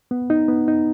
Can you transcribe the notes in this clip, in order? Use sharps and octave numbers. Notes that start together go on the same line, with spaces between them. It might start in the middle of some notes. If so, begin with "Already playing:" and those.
B3
D#4
B3
D#4